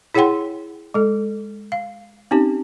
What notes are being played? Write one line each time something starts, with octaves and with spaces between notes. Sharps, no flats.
E4 G#4 C#5 F#5 G5 C6
G#3 A4
F5
C4 C#4 D#4 G4